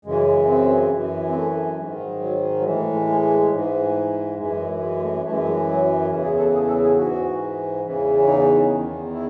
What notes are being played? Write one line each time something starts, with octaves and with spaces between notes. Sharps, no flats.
F#2 C#3 E3 G#3
C4
F#2 E3
C4
A3
G#2 D#3 G#3
F#3
F#3
F#3
A2 E3 G#3
G#3
G#3
G#2 E3
F#2 E3 G#3
G#3
G#3
A3
F#2 E3 A3
G#3
F#3
G#3
F#3
E2 C#3 E3 C#4
G#4
A4
G#4
A4
G#4
G#2 E3 F#4
E2 C#3 E3
D#4
E2 D#3
E4